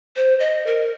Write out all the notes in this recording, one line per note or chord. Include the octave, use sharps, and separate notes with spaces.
C5
D#5
A#4